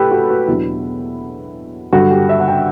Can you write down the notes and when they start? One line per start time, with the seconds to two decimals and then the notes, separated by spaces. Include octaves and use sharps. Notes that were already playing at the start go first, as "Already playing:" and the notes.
Already playing: A2 G4 A4 B4
0.11 F#4
0.29 F#4
0.48 E2 B2 F#3 B3 D4 E4
1.93 G2 D3 F#3 F#4
2.11 G4
2.29 E5
2.40 F#5
2.48 G5